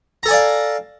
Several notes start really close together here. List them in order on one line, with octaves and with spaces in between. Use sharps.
A#5 A4 G#5 D5 F5